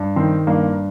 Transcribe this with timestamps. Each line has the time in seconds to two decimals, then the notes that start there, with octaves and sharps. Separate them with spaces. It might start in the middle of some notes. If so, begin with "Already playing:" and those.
Already playing: G2
0.16 D#3 C4
0.47 G2 A#3